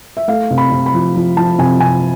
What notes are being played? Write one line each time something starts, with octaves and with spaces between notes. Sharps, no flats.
E5
A3 F5
C3
B5
C3
B5
F3
F3
F3 A5
C3 G#5
C3 G#5